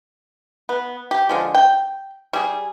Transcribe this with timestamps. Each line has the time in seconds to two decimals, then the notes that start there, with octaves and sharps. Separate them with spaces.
0.69 B3
1.11 G4
1.29 D3 F3 G#3
1.55 G5
2.33 G3 G#4